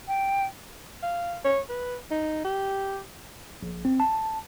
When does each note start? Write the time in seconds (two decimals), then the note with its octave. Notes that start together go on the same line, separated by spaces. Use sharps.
0.08 G5
1.02 F5
1.44 C#5
1.69 B4
2.11 D#4
2.44 G4
3.63 A#1
3.85 C4
4.00 A5